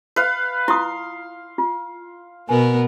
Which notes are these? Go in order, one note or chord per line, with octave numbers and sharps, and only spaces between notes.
B4 F5
E4 F4 C6 D#6
F4
B2 B3 A#4 G#5